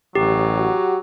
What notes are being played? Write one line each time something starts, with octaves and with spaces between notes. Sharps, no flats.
A1 F#3 G4
F#4